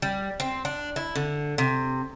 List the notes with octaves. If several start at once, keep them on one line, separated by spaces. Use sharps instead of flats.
G3
C4
D4
E4
D3
C3